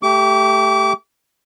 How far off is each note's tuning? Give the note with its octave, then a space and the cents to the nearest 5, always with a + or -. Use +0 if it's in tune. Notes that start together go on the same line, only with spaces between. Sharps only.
A3 +0 G4 +0 D6 -30